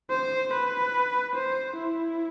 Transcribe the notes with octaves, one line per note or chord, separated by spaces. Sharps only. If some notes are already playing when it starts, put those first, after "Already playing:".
C5
B4
C5
E4